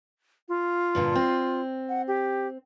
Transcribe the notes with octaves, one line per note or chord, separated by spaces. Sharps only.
F4
G2 A#2 D3
C4
F#5
G4